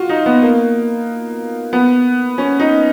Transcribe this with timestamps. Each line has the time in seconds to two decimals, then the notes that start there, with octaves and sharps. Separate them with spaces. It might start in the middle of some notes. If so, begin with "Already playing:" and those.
Already playing: F4 F#4
0.09 D#4
0.26 B3
0.42 A#3
1.73 B3
2.38 C#4
2.60 D#4